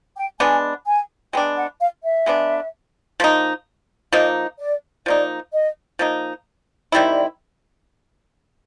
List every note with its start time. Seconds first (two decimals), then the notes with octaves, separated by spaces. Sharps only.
0.16 G5
0.40 G#3 B3 D4 G#5
0.86 G#5
1.33 G#3 B3 D4 G5
1.56 F#5
1.80 F5
2.03 E5
2.26 G#3 B3 D4
3.20 F3 A#3 D#4
4.13 F3 A#3 D#4 D#5
4.59 D5
5.06 F3 A#3 D#4 D5
5.52 D#5
5.99 F3 A#3 D#4
6.92 D#3 G3 C4 E4 D5